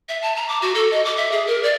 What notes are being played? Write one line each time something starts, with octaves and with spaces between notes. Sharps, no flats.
E5
A5
A#5
D6
F#4
A4
D#5
D6
E5
G#4
A#4
D5